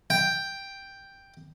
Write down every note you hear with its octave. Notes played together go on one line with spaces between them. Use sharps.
G5